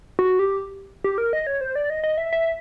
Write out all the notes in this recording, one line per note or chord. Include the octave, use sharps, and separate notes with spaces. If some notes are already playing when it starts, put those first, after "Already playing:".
F#4
G4
G4
A#4
D#5
C#5
C5
D5
D#5
D#5
E5
E5